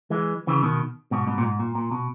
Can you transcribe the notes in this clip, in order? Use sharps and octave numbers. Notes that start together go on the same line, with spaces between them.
E3 G#3
C#3 E3
B2 D#3
G#2 B2
G#2 B2
A#2
G#2
A#2
A#2
B2